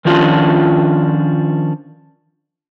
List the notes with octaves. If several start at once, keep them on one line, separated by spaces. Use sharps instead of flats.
D#3 F3 C#4 D4 F4